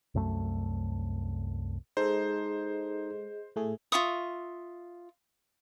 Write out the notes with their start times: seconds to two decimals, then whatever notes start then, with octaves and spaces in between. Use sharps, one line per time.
0.15 C2 F#2 A3
1.97 G#3 D#4 G#4 A4 C5 D#5
3.56 A2 A3 G#4
3.92 F4 E5 C#6 D#6